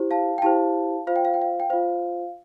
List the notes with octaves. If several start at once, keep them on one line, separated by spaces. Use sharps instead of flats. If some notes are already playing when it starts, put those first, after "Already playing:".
Already playing: E4 G4 C5
F5 A5
G5
E4 G4 C5 F5 A5
F4 C5 F5
G5
F5
G5
F5
G5
F4 C5 F5